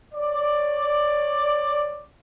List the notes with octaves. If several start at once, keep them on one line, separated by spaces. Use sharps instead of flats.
C#5 D5